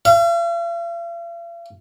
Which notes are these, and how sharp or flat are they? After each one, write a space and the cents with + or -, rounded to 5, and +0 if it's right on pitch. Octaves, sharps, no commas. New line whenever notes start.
F5 -45